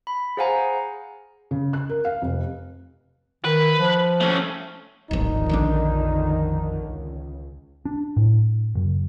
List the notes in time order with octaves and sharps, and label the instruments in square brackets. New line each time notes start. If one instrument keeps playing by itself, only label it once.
[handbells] B5
G#4 C5 F5 F#5 G#5 A#5
[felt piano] C#3
F#6
A#4
F5
F1
[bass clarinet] D#3 [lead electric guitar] B4
[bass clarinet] F3
[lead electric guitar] A3 C#4
[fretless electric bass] D1 G#1 [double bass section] F2 D3 D#3 [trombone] D#4
[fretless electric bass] A#1 G3 D4
[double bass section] C#2
[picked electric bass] D4
A2
F#1